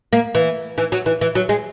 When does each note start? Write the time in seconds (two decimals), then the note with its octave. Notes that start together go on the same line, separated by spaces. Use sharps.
0.13 A#3
0.35 E3
0.78 E3
0.92 F#3
1.06 E3
1.21 E3
1.35 F#3
1.49 G#3